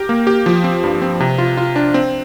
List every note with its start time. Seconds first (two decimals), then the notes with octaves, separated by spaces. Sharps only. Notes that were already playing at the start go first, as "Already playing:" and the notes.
Already playing: G4 A#4
0.09 A#3
0.27 G4
0.46 F3
0.64 C4
0.84 G2
1.02 C4
1.20 C3
1.38 F4
1.57 F4
1.76 D4
1.94 C4